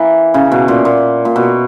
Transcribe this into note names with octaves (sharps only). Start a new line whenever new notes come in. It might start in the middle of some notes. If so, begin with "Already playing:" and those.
Already playing: E3 A#3
C#3
B2
A#2
A#2
A#2
B2